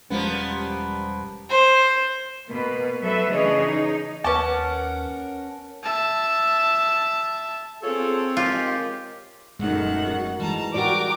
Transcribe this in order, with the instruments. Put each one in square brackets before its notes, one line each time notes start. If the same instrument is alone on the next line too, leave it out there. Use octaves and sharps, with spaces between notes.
[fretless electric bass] E1 G#3 C#4 [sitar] F3 A#3 B3 [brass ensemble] G3
[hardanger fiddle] C5
[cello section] B2 A#3 B4
F#3 A3 A4 B4 E5
C#3 E3 D4 G#4 C#5 D#5
D#4
[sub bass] D#2 [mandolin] C#4 A5 [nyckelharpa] A#4 F#5 [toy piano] B4 C#6 D6
[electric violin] E5 A5
[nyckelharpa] C4 C#5 [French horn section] F4 G#4 [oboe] A4
[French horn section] D#3 G#3 A#4 [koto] F4 [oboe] G4
[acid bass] D#1 [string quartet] F#2 D#3 F#5 [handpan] G#3 A3 D#4
[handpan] F#4
[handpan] E3 G#3 [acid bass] G3 [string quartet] A5 A#5
[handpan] F#4 G4 D5 [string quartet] A#4 G5 [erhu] D6